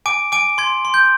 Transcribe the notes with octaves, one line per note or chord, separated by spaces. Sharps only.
G#5 D6 D7
G#5 D6 D7
C6 G#6
C6
G6